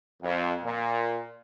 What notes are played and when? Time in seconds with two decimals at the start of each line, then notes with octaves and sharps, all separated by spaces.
0.23 F2
0.64 A#2